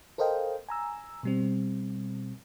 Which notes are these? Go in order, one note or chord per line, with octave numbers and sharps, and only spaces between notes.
A4 A#4 C5 D#5 F5 G5
G#5 A#5 E6
B2 G3 C4